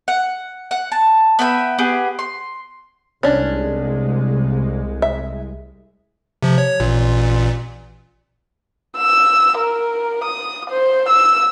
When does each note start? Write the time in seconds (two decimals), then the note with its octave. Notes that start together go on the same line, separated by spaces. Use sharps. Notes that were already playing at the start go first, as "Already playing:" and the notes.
0.08 F#5
0.71 F#5
0.92 A5
1.39 B3 E5 G5 B5
1.79 B3 G4 G#4
2.19 C6
3.23 C2 G#3 C#4 D4
5.02 E5
6.43 C3 F3
6.58 C#5
6.80 A1 A#2
8.97 E6
9.58 A#4
10.24 D#6
10.70 C5
11.09 E6